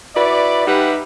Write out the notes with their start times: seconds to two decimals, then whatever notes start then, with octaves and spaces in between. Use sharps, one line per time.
0.16 E4 F#4 B4 D5
0.66 G3 D#4 G4 B4 E5 F#5